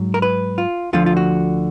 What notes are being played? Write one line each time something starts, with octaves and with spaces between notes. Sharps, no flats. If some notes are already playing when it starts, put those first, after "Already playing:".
Already playing: G#2 F#3
A#4
B4
F4
D2 D3 F3 F4
F4
F#4